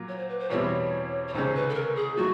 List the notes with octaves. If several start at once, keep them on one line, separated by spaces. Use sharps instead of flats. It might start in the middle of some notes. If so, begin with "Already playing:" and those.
Already playing: A#2 F#3 A#3
C#5
C5
B4
C5
E2 B2 G3 C4 E4 C#5
C#5
C#2 C3 D#3 G#3 C#4 C5
B4
A4
A#4
G#4
D#3 F#3 A3 F#4